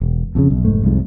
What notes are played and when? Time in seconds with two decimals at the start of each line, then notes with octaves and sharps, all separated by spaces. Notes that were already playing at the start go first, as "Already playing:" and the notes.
0.01 E1
0.35 F2 A2 C#3
0.50 B1
0.64 F1 G#2 A3
0.83 C2 F2 G#2